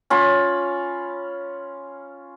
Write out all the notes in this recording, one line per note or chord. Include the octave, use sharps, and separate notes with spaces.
C#4 F4 B5